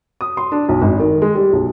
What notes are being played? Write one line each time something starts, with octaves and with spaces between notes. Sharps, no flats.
D#6
C6
D4
B1
G#1
D#3
G#3
G3
B1